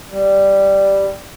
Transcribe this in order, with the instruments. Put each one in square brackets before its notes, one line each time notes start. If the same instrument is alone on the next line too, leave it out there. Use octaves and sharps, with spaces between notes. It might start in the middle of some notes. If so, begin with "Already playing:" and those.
[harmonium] G3